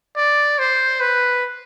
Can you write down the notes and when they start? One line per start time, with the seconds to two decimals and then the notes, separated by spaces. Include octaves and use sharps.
0.17 D5
0.59 C5
1.01 B4